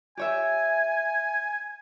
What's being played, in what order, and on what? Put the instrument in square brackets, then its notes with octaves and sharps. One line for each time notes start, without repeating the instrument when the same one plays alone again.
[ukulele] G4 C#5 E5 [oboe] G#5